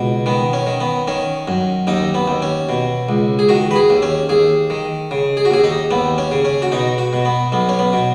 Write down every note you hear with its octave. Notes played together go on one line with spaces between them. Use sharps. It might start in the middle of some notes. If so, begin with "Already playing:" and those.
Already playing: C#2 B2
D#3 B3
C#4
D#3
B3
D#3 C#4
F#2
D#2 D#4
B3
D#2
C#4
B2
C#2
G#4
D#3 F#4
B4
G#4
D#2
C#4
D#2 G#4
D#3
C#3
G#4
F#4
D#2 G#4
D#4
D#2 B3
C#4
C#3
C#4
F#4
B2 D#4
F#4
B2
B3
B1 B3
C#4
B3
B2